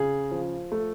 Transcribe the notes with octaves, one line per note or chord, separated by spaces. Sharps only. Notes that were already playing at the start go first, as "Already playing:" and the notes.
Already playing: C#3 G#4
F3
A3